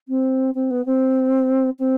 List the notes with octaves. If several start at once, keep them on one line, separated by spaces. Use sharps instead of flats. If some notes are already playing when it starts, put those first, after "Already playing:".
C4
C4
B3
C4
C4